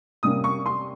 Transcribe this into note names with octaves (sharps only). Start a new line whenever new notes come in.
C3 G3 A#3 C#4 D#6
C#6
C6